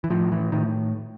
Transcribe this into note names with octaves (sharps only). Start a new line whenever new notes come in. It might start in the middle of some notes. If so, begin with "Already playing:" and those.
E3
A2 F3
E3
A2 D#3